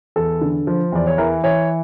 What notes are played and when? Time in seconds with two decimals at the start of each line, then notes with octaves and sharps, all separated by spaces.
0.16 E2 A4
0.41 D3
0.67 F3
0.92 E2 D5
1.07 C#5
1.18 E3 A#4
1.43 E3 C#5